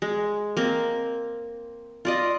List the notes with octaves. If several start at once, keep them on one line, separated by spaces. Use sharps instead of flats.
G#3
A#3 C4
F4 D5 D#5